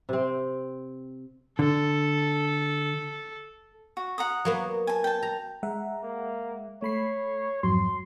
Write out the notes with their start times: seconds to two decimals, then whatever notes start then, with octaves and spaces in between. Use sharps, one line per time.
0.09 C3 C4
1.59 D3 A4
3.97 F#4
4.18 F#5 A#5 D#6
4.45 F#3 A#3 B3
4.87 G#5 A5
5.04 G5 A5
5.22 A#5
5.63 G#3 E5 F#5 A#5
6.03 A#3
6.82 A3 C#5 B5 C7
7.63 F2 G#2 F#3 C6